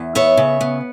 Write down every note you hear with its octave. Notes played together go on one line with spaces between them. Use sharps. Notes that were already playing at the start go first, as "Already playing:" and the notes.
Already playing: E2
B3 C#5 E5
C#3
B3